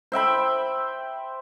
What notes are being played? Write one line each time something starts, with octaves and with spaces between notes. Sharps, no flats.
C5 E5 G5 B5